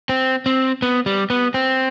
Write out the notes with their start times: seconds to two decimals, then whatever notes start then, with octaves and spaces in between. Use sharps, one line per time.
0.09 C4
0.46 C4
0.82 B3
1.06 G3
1.30 B3
1.54 C4